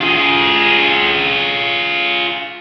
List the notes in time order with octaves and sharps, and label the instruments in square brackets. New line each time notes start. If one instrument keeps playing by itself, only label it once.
[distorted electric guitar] F4 G#4